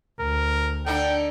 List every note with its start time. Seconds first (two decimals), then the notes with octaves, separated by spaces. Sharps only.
0.20 D2 A#4
0.86 D3 D4 D#4 G5